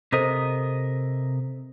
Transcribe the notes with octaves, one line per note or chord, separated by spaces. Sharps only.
C3 A4 A#4 C5 D#5 B6